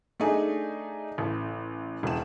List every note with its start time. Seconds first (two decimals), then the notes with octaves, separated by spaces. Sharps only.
0.20 A3 D4 D#4 G#4
1.18 A1
2.03 E1 E7